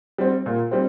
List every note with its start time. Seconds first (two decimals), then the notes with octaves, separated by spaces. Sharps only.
0.18 G3 C4
0.46 A#2
0.71 G3 C4